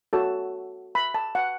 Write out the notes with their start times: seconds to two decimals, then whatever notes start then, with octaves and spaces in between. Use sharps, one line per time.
0.13 F#4 A4 C#5 A5
0.95 B5
1.14 A5
1.35 F#5